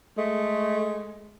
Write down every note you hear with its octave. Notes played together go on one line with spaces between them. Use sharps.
G#3 A3